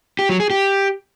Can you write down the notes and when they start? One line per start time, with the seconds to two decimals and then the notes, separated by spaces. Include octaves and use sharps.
0.19 G4
0.29 F#3
0.40 G#4
0.50 G4